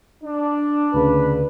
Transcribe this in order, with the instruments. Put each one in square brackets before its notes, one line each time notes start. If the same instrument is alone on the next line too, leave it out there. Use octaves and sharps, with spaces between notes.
[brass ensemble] D4
[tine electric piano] D2 C#3 [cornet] B4